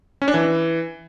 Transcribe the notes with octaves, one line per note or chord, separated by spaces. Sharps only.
C#4
D4
E3